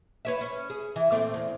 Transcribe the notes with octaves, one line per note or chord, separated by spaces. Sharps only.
B4 C#5 E5
C#4
G#4
E3
A#2 A3 C4
E2